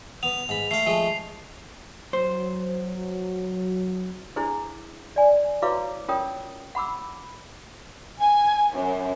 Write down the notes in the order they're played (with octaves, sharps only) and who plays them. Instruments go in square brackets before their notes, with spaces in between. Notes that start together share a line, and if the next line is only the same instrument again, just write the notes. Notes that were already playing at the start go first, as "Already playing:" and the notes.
[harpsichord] B3 [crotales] F7
[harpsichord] G#2 B5
[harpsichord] A3 F5 [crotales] C7
[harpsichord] F3 G#3 A3
[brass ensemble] F#3 [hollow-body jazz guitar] C5
[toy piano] D4 E4 G#4 C5
D5 G#5
E4 F#4 B4 C#5 F5 D6
C#4 F4 A#4 C#5 G5 D#6
F#5 B5 D6 E6
[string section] G#5
F#2